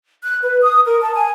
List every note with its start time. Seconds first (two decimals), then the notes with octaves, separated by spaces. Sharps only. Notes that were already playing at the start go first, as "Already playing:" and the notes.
0.22 F#6
0.41 B4
0.61 D#6
0.85 A#4
1.00 A5
1.13 G#5